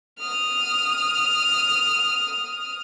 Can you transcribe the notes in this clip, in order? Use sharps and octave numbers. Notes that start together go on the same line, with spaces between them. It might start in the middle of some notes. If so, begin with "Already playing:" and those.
D#6 F6